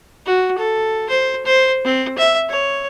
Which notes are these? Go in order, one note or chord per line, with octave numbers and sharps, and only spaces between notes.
F#4
A4
C5
C5
C4
E5
C#5